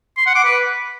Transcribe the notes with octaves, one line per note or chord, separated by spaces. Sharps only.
C6
F#5
D6
B4